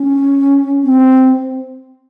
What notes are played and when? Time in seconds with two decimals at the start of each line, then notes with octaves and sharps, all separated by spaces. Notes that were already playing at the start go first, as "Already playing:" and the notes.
Already playing: C#4
0.84 C4